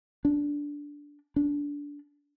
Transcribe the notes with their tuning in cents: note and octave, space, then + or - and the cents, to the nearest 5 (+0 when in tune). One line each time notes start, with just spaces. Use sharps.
D4 -10
D4 -20